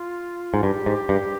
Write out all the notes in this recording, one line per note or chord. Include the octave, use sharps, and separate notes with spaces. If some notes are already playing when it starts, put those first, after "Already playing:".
Already playing: F4
G#2
G2 G4
G#2
G2